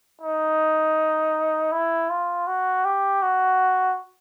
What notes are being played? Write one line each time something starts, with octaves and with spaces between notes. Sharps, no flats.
D#4
E4
F4
F#4
G4
F#4